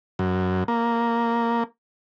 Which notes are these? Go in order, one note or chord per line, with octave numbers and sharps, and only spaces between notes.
F#2
A#3